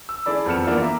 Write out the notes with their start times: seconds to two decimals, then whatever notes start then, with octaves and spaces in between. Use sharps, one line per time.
0.09 E6
0.26 E4 G#4 A4 D5 B5
0.46 F2 B3 A4 F6 C#7 E7
0.67 E3 A#3 B3 D4 E4 F4
0.82 E5 A#5 D6